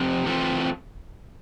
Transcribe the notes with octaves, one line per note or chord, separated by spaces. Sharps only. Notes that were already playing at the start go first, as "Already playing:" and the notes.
Already playing: F2 C3
E3 A3 C4 F4 A4